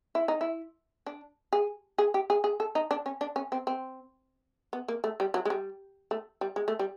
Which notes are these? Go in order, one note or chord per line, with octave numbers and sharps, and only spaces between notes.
E4
D#4
E4
D4
G#4
G#4
G4
G#4
G#4
A4
D#4
D4
C#4
D4
C#4
C4
C4
B3
A#3
A3
G3
F#3
G#3
G3
A3
G3
G#3
A3
G3